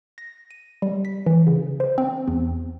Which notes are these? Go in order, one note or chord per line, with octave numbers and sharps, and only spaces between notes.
A#6
D#7
G3
B6
E3
C#3
C5
C4
E2